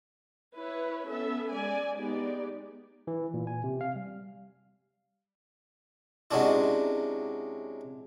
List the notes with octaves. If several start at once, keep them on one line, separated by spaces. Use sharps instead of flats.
E4 B4 C#5
B3 C#4 A4 E5
G#3 D5 G#5
G#3 B3 D#4 G4 D5
E3
A#2
G#5
C3
F5
G3
C3 F#3 G#3 C#4 D4 E4